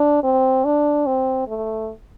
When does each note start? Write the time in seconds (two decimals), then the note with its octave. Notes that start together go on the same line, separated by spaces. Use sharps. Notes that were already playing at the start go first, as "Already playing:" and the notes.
Already playing: D4
0.24 C4
0.65 D4
1.06 C4
1.48 A3